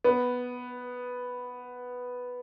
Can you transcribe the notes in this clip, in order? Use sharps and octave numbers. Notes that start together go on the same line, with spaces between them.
B3